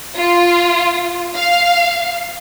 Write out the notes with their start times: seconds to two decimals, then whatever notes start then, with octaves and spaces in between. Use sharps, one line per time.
0.18 F4
1.36 F5